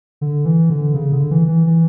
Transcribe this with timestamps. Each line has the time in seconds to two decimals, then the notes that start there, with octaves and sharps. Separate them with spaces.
0.21 D3
0.45 E3
0.70 D3
0.94 C#3
1.12 D3
1.31 E3
1.48 E3
1.67 E3